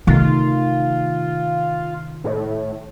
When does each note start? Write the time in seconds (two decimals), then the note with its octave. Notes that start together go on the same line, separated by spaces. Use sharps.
0.07 C3 D#3 A3 F4
2.24 A2